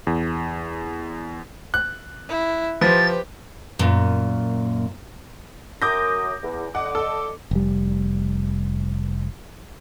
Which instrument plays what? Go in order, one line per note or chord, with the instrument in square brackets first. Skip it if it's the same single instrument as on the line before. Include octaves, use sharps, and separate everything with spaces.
[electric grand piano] E2
[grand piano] F#6
[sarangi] E4
[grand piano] F3 [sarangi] G4 [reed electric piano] B4 C5 [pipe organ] A6
[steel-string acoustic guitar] F#2 A#2
[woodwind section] F#2 D#6 [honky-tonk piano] D6 G6 A#6
[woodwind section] E2
[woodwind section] D3 D#5 D6 [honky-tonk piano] F#5
[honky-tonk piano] A4
[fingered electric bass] F1 G3